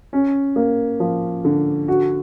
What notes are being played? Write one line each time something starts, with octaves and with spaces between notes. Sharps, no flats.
C#4
A#3
F3
D3
F#4